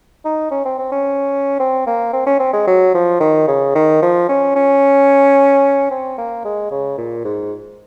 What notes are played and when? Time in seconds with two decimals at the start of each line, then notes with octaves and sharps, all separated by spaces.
0.25 D#4
0.51 C#4
0.65 C4
0.79 C4
0.92 C#4
1.60 C4
1.87 A#3
2.13 C4
2.26 C#4
2.39 C4
2.53 G#3
2.67 F#3
2.94 F3
3.20 D#3
3.47 C#3
3.75 D#3
4.02 F3
4.29 C#4
4.56 C#4
5.91 C4
6.18 A#3
6.44 G#3
6.71 C#3
6.98 A#2
7.24 G#2